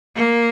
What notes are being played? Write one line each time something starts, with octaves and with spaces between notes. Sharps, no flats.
A#3